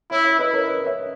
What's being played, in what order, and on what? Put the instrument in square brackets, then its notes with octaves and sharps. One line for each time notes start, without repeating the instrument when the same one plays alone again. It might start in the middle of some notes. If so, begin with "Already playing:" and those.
[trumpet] E4 [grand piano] C#5 E5
[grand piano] C#5 E5
[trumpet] E4 [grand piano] B4 D#5
[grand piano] A#4 C#5
B4 D#5
C#5 E5